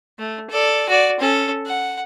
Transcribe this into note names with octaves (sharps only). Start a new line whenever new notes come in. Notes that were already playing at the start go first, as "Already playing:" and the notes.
A3
A4 D5
F#4 D5
C#4 A4
F#5